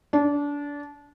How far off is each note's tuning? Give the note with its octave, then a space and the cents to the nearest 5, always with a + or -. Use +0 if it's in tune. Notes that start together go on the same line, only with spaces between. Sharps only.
D4 -25